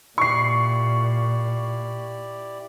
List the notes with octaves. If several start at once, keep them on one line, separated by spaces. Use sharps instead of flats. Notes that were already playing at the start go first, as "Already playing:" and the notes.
A#2 E4 G4 D5 C#6 C7